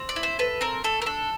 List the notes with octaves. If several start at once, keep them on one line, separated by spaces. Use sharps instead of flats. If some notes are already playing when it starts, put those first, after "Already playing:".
Already playing: C4
D5
E4
C5
A4 B4
C4 A#4
A3 A4
A#4
D4 A4